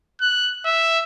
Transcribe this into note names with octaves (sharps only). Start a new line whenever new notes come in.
F#6
E5